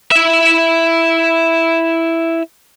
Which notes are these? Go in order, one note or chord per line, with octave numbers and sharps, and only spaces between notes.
E4 E5